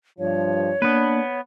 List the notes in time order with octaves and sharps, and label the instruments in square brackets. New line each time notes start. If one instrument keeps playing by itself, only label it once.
[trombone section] G2 F3 [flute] C#5
[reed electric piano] A#3 [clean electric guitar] B3 B4 [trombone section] D4